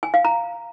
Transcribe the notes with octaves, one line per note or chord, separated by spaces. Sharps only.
G#5
F5
A#5